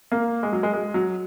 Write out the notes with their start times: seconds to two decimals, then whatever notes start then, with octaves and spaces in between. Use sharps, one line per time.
0.12 A#3
0.43 G#3
0.52 F#3
0.63 G#3
0.73 G#3
0.94 F#3